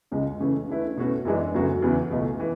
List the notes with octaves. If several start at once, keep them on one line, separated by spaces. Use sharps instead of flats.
C#2 C#3 G#3
C#3 E3 A3 C#4
D3 A3 E4 B4
B2 A3 C#4 F#4 B4
F#2 E3 G#3 D4
D2 C#3 F#3 B3 F#4
E2 C#3 E3 B3
C#2 B2 A3
E3